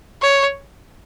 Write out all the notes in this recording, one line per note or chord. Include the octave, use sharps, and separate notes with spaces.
C#5